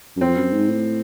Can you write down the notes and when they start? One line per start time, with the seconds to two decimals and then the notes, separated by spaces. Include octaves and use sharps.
0.17 F#2
0.21 F2 C4
0.36 F#2
0.52 G#2
0.68 A2